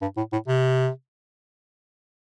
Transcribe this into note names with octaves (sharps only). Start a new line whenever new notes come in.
G2
A2
A2
C3